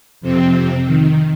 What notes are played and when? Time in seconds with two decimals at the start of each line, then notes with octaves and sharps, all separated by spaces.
0.21 F2 C3 C4
0.86 D#3